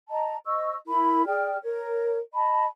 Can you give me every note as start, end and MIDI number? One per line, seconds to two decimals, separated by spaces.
0.10 0.36 75
0.10 0.36 81
0.10 0.36 82
0.46 0.75 72
0.46 0.75 75
0.46 0.75 85
0.46 0.75 88
0.88 1.25 64
0.88 1.25 70
0.88 1.25 83
1.26 1.57 68
1.26 1.57 74
1.26 1.57 79
1.26 1.57 89
1.63 2.18 70
1.63 2.18 73
2.33 2.65 75
2.33 2.65 81
2.33 2.65 83